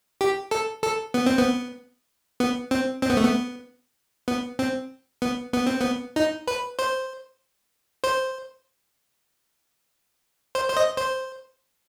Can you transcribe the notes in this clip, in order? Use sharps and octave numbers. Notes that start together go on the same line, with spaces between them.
G4
A4
A4
B3
C4
B3
B3
C4
C4
B3
A3
B3
B3
C4
B3
B3
C4
B3
D#4
B4
C5
C5
C5
C5
D#5
C5